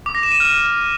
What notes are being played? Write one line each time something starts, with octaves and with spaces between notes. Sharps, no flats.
D6
A#6
E7
D#7
F6